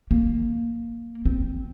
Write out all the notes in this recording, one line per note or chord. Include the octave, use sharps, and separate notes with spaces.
A#3
C4